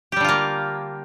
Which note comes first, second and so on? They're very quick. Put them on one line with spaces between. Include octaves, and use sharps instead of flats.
G4 G3 D3 F4 A#3